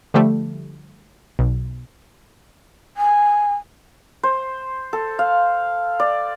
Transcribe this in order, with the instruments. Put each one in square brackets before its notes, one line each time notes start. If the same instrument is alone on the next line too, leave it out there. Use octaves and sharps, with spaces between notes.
[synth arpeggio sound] D3 F3 G3 A3
B1
[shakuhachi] G#5
[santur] C5
A4
F5
D5